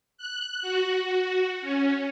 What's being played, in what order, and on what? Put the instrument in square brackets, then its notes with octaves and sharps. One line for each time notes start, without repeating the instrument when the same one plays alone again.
[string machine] F#6
F#4
C#4